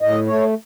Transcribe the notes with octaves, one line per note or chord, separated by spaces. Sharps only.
A2 D#5
A3 C#5